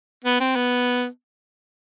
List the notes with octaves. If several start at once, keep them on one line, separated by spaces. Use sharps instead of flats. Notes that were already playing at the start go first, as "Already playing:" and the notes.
B3
C4
B3